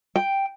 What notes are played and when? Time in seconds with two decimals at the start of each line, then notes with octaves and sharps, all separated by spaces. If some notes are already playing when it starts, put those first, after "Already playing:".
0.16 G5